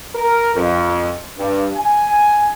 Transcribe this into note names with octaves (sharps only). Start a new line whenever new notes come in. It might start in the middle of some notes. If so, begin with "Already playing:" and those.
A#4
F2
G2
G#5